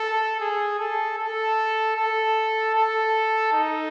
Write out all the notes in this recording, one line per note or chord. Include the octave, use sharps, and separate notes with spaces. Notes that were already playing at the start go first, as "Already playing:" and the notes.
Already playing: A4
G#4
A4
A4
A4
A4
D#4